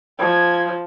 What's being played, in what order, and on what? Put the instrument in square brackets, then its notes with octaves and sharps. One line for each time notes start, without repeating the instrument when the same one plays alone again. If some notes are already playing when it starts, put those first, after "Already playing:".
[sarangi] F3 [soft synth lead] G#6